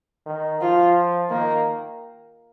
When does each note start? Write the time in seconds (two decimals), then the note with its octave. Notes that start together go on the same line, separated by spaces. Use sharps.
0.26 D#3
0.61 F3 F4
1.29 D#3 A#3